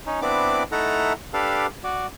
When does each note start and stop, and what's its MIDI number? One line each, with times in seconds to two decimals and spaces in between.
0.06 0.20 61
0.06 0.20 63
0.22 0.63 59
0.22 0.63 60
0.22 0.63 62
0.22 0.63 64
0.22 0.63 74
0.22 0.63 86
0.72 1.13 57
0.72 1.13 63
0.72 1.13 64
0.72 1.13 69
0.72 1.13 78
0.72 1.13 82
1.33 1.66 62
1.33 1.66 67
1.33 1.66 69
1.33 1.66 71
1.33 1.66 77
1.84 2.07 66
1.84 2.07 74